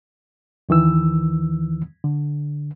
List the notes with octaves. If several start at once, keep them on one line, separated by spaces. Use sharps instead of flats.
D#2 D#3 E3 E6
D3